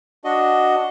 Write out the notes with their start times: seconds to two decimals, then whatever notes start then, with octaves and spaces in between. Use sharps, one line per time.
0.24 D4 F#4 D#5